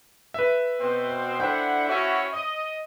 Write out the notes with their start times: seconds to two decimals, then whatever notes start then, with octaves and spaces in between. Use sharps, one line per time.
0.34 B4 E5
0.80 B2 C4 C5
1.40 D3 E4 C5 F#5 G5
1.88 C#4 E4 F#4
2.33 D#5